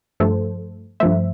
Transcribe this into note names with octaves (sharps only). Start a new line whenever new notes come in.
G2 F3 A3 A4 C5
G2 F3 A3 C5 E5